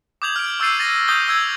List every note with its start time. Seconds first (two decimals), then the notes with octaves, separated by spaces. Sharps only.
0.22 D6 D#6 G6 G#6 F7 F#7
0.36 F6 D7
0.60 C#6 E6 G6 A6 C7 D#7
0.80 A6 A#6 D#7
1.08 D#6 G6 G7
1.28 E6 G#6 G7